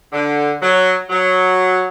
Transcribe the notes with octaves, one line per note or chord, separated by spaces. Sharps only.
D3
F#3
F#3